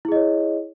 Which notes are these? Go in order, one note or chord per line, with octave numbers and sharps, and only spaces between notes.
E4 G#4 C#5 D#5